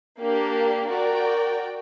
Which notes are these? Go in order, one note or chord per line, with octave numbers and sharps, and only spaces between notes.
A#3 D4 G4
F#4 A#4 D5 G5